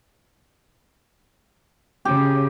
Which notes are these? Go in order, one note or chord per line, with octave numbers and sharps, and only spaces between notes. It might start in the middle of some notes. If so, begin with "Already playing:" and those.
C#3 G4